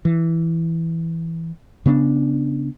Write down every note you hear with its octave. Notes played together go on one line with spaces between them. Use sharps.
E3
C#3 B3 C4 D4